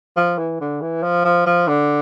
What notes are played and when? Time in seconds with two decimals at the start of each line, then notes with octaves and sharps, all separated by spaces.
0.17 F3
0.38 E3
0.61 D3
0.81 E3
1.03 F3
1.25 F3
1.46 F3
1.68 D3